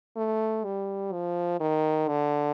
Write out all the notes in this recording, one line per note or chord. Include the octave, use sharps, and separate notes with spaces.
A3
G3
F3
D#3
D3